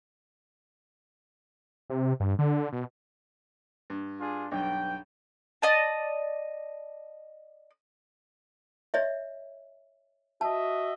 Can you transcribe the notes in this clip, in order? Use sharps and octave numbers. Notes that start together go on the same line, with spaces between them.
C3
G2
D3
B2
G2
D4 F4 G#4
B1 G2 G5
D5 D#5 A5
C#5 D#5 E5
F#4 D#5 E5 A5